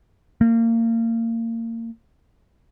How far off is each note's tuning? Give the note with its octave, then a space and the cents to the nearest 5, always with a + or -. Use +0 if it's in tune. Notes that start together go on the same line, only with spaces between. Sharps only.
A#3 -30